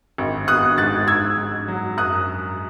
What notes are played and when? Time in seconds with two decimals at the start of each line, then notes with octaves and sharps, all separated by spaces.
0.18 G#1
0.47 B3 D#6 F#6
0.78 G#2 F#6 A6
1.07 G#2 E6 G#6
1.38 G#2
1.68 F#3
1.97 F#2 D#6 F#6